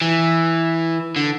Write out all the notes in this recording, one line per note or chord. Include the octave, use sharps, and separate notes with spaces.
E3
D3